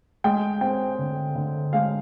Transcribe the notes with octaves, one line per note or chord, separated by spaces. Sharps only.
G#3 G5
C4 G5
D3
D3
G#3 F5